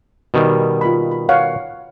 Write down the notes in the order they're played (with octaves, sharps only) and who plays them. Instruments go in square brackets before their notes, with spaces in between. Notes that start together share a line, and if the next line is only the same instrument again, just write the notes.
[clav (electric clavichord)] B2 D#3 G3
[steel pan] F4 B5
B5
C#5 F5 F#5